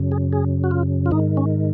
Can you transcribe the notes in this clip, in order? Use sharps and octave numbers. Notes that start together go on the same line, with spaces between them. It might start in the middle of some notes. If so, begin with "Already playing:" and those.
Already playing: F#2 C#3
G#4
G#4
F#4
F4
F4
G#2 D#3 D#4
C#4